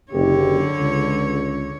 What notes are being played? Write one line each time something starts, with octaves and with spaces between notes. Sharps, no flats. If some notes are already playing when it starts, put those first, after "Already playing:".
F#1 D3 G4 C#5
C#2